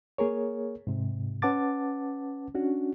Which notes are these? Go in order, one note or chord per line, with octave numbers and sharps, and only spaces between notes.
A#3 G#4 A#4 C#5
G#2 C3
C#4 B4 F#5 A5 D6 A6
C#4 D4 F#4